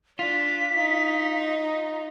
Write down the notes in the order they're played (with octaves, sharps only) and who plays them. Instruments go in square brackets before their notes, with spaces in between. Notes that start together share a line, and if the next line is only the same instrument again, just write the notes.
[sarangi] D4 [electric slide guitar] F4 [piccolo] B6
[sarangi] D#4